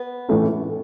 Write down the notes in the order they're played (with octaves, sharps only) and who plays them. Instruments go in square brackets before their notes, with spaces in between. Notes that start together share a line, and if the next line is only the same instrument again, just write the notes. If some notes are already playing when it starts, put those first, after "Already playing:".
Already playing: [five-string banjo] B3
[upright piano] A2 E3 A3 C#4